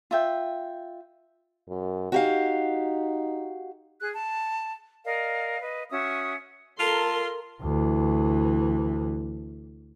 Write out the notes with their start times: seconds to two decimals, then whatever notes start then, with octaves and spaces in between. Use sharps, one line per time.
0.11 F4 E5 G5
1.69 F#2
2.12 D#4 F#4 G4 F5
4.00 G#4 F#6
4.14 A5
5.04 A#4 D5 D#5 F5
5.60 B4 D#5
5.91 C#4 F#4 E5 D#6
6.79 F4 A4 A#4 A5 C6
7.63 D2 E3